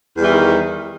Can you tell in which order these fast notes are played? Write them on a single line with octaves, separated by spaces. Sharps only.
E2 G3 E3 D#3